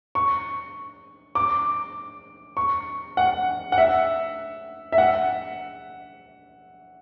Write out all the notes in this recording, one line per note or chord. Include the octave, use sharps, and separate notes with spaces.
C#6
D6
C#6
F#5
F#5
E5
E5
F#5